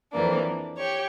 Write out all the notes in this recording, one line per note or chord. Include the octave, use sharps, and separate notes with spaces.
F2 E3 A#3 D4
G4 C#5